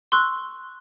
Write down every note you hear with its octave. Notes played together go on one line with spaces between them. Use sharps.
C6 C#6 E6 F#6